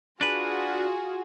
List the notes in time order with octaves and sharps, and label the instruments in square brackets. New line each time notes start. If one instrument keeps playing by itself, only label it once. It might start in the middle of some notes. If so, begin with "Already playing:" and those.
[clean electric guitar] D4 B4 [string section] F4 F#4 G#4